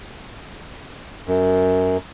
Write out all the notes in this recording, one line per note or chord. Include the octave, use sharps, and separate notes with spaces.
F#2